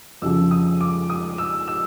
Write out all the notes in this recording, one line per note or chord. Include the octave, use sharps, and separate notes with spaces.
F2 C#3 F3 E6
D#6
D6
D#6
E6
E6